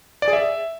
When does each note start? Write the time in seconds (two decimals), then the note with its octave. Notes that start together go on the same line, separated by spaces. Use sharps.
0.22 D5
0.28 G#4
0.33 E5